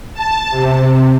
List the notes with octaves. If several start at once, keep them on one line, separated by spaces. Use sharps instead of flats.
A5
C3